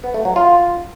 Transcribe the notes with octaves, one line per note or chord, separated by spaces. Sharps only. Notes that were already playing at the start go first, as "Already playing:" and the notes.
B3
A3
F#3
F4